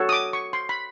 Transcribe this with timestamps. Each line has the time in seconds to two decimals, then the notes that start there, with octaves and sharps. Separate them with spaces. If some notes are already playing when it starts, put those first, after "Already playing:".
Already playing: F#4 A4 C#5
0.09 D#6
0.12 D6
0.33 C#6
0.53 C6
0.69 B5